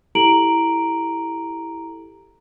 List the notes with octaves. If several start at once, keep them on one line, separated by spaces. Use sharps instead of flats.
E4 G4 A4 A#5 D7 F#7